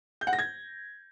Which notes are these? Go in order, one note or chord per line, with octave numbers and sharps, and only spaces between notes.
G6
F#5
A#6
G#6